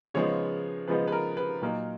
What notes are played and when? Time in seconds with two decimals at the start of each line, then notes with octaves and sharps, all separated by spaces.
0.14 C#3 F3 G#3 B3 D#4 C#5
0.88 C#3 F3 G#3 B3 D#4 B4
1.08 B4
1.12 A#4
1.37 B4
1.62 A#2 F#3 A#3 D#4 A#4